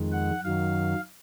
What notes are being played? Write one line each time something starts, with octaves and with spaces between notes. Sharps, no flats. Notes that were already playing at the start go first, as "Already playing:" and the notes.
Already playing: F2 D#3 G#3
F#5
F#2 D#3 F#3 F5